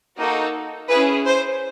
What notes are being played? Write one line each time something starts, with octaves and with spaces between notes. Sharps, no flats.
A#3 D#4 F#4 A4
C#4 E4 G#4 B4
C5